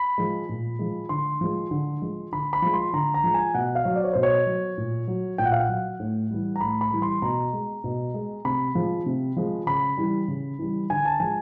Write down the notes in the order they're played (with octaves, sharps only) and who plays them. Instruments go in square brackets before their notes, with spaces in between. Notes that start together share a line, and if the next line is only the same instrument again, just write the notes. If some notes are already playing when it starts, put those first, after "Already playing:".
Already playing: [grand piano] B5
F3 G#3
A#2
F3 G#3
D3 C6
F3 G#3
D3
F3 G#3
D3 B5
B5
F3 G#3
C6
D3 A#5
A#5
F3 G#3
G#5
B2 F#5
F5
F#3
D5
C#5
B2 C5
C#5
F#3
A#2
F#3
A#2 G5
F#5
F5
F#5
F#3
A2
E3 G3
A#5
A2 B5
B5
E3 G3
C6
B2 A#5
G#3
B2
G#3
C3 B5
F3 G#3
C3
F3 G#3
C#3 B5
E3 G3
C#3
E3 G3
D3 G#5
A5
F3 G#3 G#5